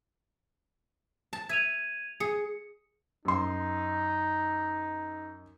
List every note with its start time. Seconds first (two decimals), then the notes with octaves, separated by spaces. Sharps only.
1.33 A5
1.49 E5 G#6 D#7 F7
2.20 G#4 C#7
3.25 F#2 D#4 C6